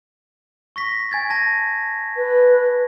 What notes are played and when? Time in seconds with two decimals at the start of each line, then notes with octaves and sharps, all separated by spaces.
0.76 C#6 A#6 B6
1.11 G#5 G#6 A6
1.30 A5 A#6
2.16 B4